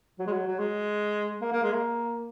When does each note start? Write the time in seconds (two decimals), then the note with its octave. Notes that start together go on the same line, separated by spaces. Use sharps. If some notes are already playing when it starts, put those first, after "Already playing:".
0.19 F#3
0.27 G#3
0.32 F#3
0.46 F#3
0.59 G#3
1.41 A#3
1.52 A#3
1.63 G#3
1.73 A#3